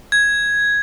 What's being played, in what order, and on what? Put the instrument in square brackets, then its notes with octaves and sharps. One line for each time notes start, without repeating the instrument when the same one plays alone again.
[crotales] G#6